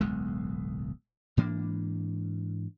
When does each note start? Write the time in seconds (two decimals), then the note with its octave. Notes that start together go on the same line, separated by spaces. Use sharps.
0.01 D1 B1 E2 G#3
1.37 G#2 E3 A#3 D4